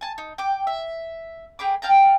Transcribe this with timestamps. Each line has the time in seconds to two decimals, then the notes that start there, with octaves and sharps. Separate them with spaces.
0.01 G#5 A5
0.18 D#4
0.38 G5 D6
0.67 E5
1.59 G4 G#4 B5 D6
1.82 F5 G5 A5 A#5